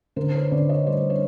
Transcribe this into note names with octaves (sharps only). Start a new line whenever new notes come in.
D3 A#4 C5
B4 C#5
D3 C5 D5
C#5 D#5
G3 C5 D5
B4 C#5